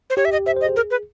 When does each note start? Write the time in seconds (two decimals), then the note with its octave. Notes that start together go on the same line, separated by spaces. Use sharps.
0.10 C5
0.17 G4 C#5
0.25 E5
0.32 D#5
0.46 C5 E5
0.57 C5
0.61 D#5
0.66 G#4
0.76 A#4
0.91 B4